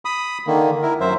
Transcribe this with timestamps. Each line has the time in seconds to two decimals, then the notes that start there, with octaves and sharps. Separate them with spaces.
0.05 B5 D#6
0.47 D3 D#3 A#3
0.83 E4 A#4
1.00 F#2 F#3 C5 E5